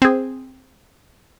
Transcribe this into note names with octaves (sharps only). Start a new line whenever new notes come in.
C4 G#4